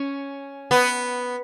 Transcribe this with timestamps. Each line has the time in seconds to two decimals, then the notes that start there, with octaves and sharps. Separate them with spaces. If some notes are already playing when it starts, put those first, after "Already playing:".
Already playing: C#4
0.71 B3